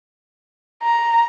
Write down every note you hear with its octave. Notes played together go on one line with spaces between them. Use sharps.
A#5